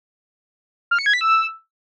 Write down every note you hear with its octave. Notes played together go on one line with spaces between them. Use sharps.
F6
C#7
G#6
B6
E6